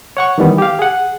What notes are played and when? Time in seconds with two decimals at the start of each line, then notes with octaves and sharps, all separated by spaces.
0.17 C#5 F#5 C#6
0.38 D#3 E3 G3 B3
0.58 G4 F5
0.79 G#4 F#5